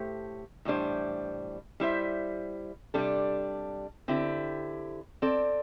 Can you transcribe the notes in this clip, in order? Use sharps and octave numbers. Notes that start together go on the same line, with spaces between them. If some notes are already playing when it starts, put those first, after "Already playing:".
Already playing: A2 A3 G4 C5
A2 E3 G3 D4 C5
G3 E4 C5 E5
C3 G3 D4 A4
D3 C4 E4 G4
C4 A4 D5